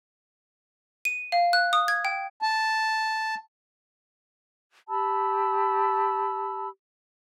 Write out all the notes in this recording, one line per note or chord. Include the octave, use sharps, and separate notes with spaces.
D#7
F5
F#6
D#6
G#6
G5
A5
G4 A5 B5 E6